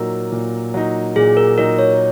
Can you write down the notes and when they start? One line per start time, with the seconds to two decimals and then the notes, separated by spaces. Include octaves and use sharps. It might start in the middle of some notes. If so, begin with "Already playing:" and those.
Already playing: A#2 F#3 D#4 A#4
0.32 A#2
0.74 F#3 D#4
1.16 A#2 G#4
1.37 A#4
1.58 F#3 D#4 A#4
1.79 C#5